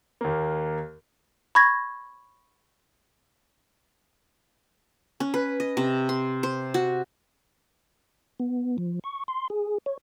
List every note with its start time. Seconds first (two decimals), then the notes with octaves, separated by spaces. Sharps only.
0.21 D#2 A#3
1.55 B5 C#6 G#6 A#6
5.20 C#4
5.34 B4
5.60 D#5
5.77 C3
6.09 C6
6.43 C5
6.74 F#4
8.40 B3
8.78 F3
9.04 C#6
9.28 C6
9.50 G#4
9.86 C#5